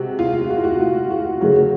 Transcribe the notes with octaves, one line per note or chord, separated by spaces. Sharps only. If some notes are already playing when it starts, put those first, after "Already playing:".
Already playing: C3 G#3 F#4
F4
F#4
F4
F#4
F4
F#4
C#3 F#3 A3 F#4